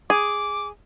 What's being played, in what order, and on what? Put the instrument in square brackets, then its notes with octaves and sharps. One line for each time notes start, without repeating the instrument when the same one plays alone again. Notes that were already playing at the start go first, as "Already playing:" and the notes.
[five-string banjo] G#4 [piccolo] D6